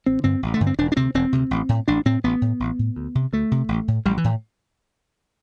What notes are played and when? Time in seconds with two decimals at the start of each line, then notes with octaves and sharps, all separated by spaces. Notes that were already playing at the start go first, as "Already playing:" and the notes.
0.06 A1 C4
0.24 G2 D3 C4
0.43 A1
0.54 A3
0.60 G2 D3
0.67 C4
0.78 E1 D4
0.92 D4
0.96 D2 C3 C4
1.14 E1 C4
1.33 D2 C3
1.51 A1
1.69 A2
1.88 A1 D4
2.05 A2 C4
2.24 A1 B3
2.42 A2
2.60 A1
2.79 A2
2.96 D2
3.15 C3
3.33 D2 A3
3.51 C3
3.69 A1
3.88 A2
4.05 A1 G3
4.18 E3
4.24 A2